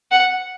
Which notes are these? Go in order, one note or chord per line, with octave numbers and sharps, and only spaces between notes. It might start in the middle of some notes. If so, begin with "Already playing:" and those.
F#5